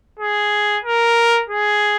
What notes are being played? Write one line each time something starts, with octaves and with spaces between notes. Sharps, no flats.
G#4
A#4
G#4